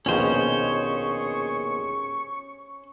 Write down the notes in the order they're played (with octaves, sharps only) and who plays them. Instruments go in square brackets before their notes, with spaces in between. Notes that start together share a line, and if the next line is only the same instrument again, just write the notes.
[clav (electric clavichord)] A#1 D#2 B2 [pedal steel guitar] C#4 C5 [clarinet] G#4 [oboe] C#6